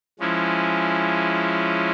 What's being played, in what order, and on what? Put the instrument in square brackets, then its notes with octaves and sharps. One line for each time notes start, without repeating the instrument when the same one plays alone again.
[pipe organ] F3 G#3 C#4 E4